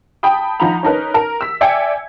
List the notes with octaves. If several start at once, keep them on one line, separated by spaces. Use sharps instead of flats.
G5 A5 B5 D#6
F3 D#4 F#5 A#5 B5 F7
C#4 D#4 A#4 B4
A#4
E6 B6
D5 E5 G5 G#5 G#6 C#7